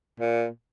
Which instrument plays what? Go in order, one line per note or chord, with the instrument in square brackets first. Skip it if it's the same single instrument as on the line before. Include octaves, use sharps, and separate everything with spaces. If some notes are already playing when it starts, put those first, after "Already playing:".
[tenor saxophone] A#2